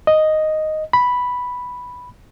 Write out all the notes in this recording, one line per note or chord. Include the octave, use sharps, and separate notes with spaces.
D#5
B5